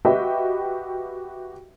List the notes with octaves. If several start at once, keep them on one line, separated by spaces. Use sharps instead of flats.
F#4 G4 B4 D#5 E5 G5